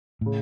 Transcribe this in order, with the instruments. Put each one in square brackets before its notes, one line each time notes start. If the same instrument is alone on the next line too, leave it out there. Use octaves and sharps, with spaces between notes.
[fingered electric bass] A2 [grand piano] C#3